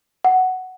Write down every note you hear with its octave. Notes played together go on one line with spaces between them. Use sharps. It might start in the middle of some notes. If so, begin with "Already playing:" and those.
F#5